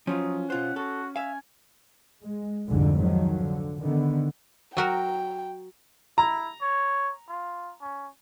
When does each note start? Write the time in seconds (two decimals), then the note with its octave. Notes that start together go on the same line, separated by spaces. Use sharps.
0.07 F3 F#3 C#4 D#4 F4
0.50 B2 F4 C5 F#5
0.76 F#4 A4
1.16 E5 F5 G#5
2.23 G#3
2.68 C2 F2 G#2 D3 F3 G#3
2.99 D#3 F3 F#3
3.42 D3
3.81 D3 D#3 B3
4.77 F#3 F#4 A#4 G5
6.18 E4 A#5
6.62 C#5
7.29 F4
7.81 C#4